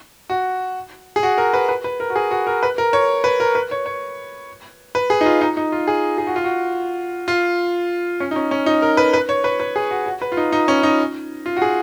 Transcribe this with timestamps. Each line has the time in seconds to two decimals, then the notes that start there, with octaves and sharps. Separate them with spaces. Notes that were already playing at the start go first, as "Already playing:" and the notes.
0.30 F#4
1.16 G#4
1.23 F#4
1.38 A#4
1.53 B4
1.69 B4
1.84 B4
2.00 A#4
2.10 F#4
2.16 G#4
2.31 F#4
2.47 A#4
2.63 B4
2.78 A#4
2.93 C#5
3.24 B4
3.40 A#4
3.55 B4
3.71 C#5
3.86 C#5
4.95 B4
5.10 G#4
5.21 D#4
5.26 F4
5.41 D#4
5.57 D#4
5.72 F4
5.87 G#4
6.18 G#4
6.27 F#4
6.36 F4
6.44 F#4
7.28 F4
8.20 C#4
8.31 D#4
8.36 C#4
8.51 C#4
8.66 D#4
8.82 A#4
8.97 B4
9.13 B4
9.29 C#5
9.44 B4
9.60 B4
9.76 G#4
9.91 F#4
10.06 F#4
10.22 B4
10.32 F4
10.37 D#4
10.52 D#4
10.68 C#4
10.83 D#4
11.46 F4
11.57 F#4
11.62 G#4